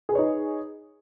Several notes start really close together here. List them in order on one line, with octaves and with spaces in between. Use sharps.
G#4 B4 C#5 D#4